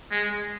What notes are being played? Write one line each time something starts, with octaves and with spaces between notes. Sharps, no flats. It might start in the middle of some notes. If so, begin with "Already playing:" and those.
G#3